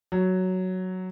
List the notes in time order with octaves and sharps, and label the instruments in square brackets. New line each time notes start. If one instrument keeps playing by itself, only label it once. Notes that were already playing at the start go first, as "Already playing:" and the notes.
[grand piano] F#3